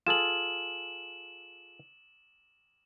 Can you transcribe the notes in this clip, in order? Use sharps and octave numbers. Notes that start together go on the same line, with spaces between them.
F4 G#4 A4 E7 F#7